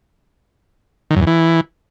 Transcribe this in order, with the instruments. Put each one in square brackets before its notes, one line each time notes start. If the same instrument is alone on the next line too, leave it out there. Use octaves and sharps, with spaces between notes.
[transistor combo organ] D#3
F#2
E2
E3